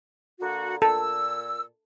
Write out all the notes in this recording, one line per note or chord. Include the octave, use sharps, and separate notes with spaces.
D3 A#3 F#4
A#2 A4 E6